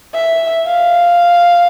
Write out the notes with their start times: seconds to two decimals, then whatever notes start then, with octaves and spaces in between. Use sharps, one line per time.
0.14 E5
0.67 F5